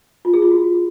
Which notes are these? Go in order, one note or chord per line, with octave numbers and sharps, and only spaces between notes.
F4
G#4
F4
F#4